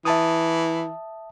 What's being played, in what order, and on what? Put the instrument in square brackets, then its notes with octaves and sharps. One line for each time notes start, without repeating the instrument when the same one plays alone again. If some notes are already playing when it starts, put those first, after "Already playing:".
[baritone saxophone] E3 [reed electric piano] E5 A5 D#6